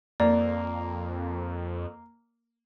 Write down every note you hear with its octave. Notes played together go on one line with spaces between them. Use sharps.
F2 A#3 D5